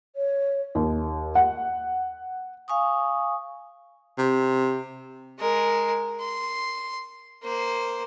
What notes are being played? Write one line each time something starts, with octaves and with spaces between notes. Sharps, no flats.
C#5
D#2
F#5
F5 G#5 C#6 D#6
C3
G#3 A#4
C6
A#3 C5